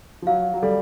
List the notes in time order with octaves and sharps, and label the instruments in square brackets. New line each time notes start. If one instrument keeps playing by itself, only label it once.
[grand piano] F3
[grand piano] F#3 [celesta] F5
[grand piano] F#3
[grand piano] G3 [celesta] A4